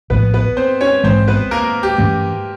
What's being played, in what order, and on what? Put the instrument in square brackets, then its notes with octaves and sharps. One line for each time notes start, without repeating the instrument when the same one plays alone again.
[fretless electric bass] A#1 A2 F3 [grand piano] B3 B4
[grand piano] B3 B4
C4 C5
C#4 C#5
[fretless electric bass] A#1 G#2 E3 G#3 [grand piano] C4 C5
[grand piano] B3 B4
A#3 A#4
G4
[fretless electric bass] G2 E3 A3 C#4